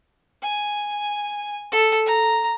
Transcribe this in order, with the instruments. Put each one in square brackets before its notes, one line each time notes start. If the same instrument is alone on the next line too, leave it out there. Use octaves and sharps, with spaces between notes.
[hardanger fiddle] G#5
A4
A#5